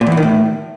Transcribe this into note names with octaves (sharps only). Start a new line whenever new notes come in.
A#2
E2
E3
D#3
A2